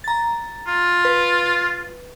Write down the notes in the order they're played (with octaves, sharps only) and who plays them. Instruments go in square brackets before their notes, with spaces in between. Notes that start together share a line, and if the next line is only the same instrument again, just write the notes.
[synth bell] A#5 A6
[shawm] F4
[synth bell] B4